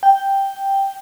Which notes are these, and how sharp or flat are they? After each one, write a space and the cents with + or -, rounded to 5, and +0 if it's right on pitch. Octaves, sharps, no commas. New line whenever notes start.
G5 +0